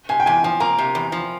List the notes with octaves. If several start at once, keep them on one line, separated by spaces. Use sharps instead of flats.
C3 G#5
G5
E2 G#5
F3 G#5
A#3 A#5
C3
E2
F3